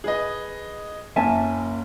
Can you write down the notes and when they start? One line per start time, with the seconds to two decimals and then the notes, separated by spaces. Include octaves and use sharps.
0.04 G#4 B4 D#5
1.16 F#1 A#3 C#4 E5 G#5 A5